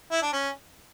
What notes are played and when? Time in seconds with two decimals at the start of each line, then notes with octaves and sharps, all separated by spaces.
0.12 E4
0.22 D4
0.33 C#4